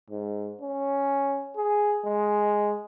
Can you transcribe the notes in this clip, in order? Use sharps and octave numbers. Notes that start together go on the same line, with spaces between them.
G#2
C#4
G#4
G#3